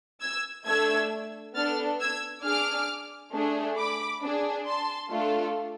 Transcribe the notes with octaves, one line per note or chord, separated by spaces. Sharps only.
E6 G#6
A3 D4 A4 E6 G#6
B3 D4 A4 F6 A6
E6 G#6
D4 G#4 D6 F6
A3 D4 G#4
B5 D6
D4 G#4
A5 C6
A3 D4 F4 A4